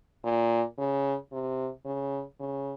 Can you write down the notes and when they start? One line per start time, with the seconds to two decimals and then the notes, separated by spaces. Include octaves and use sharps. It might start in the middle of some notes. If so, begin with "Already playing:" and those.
0.25 A#2
0.78 C#3
1.33 C3
1.85 C#3
2.40 C#3